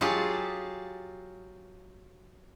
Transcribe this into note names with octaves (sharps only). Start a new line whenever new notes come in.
F#3 F4 G4 G#4 A5